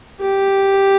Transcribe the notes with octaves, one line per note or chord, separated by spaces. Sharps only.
G4